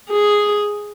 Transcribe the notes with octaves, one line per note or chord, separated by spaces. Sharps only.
G#4